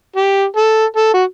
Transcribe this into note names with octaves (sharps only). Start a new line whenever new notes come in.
G4
A4
A4
F#4